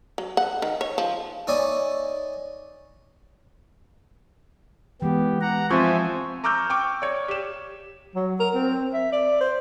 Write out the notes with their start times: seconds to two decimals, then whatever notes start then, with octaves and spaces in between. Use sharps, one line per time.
0.18 F#3
0.37 F#5
0.62 D#3
0.81 C#5
0.98 F3
1.47 D#4 C#5 D5 E5 G#5 B5
5.02 E3 G#3 B3 G4
5.41 F#5 A#5
5.71 F3 C4 C5 E5 G#5 C#6
6.44 A#5 C#6 D6 E6 F6 G6
6.70 G5 C#6 D6
7.02 C#5 D5
7.28 G4 E7
8.15 F#3
8.40 A#4
8.55 C4
8.93 E5
9.12 D5
9.41 C5